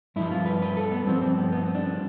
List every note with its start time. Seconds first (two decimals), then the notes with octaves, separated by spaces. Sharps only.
0.16 G2 F3 E4
0.31 F4
0.46 B4
0.62 B4
0.77 A4
0.91 B3
1.06 G2 F3 C4
1.22 C4
1.38 B3
1.52 B3
1.66 C4
1.75 D4